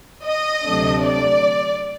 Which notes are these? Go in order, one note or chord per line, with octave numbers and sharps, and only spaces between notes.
D#5
D2 C3 F#3 A3 D4
D5